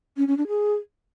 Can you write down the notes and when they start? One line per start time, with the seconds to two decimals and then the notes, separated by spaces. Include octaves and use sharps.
0.17 C#4
0.27 C#4
0.38 D4
0.48 G#4